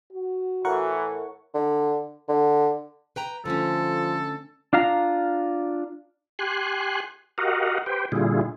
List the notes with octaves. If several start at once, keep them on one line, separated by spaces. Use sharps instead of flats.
F#4
A2 E3 A#4 F#5 C#6
D3
D3
B4 G5 A#5
D3 F3 A3 C#4 A4
D4 F4 F5 A#5
G4 G#5 C6 F#6
F#4 G4 A#4 D#5 F5 F#5
G4 B4 C5 G5
A#2 D3 G3 E4 F4 G#4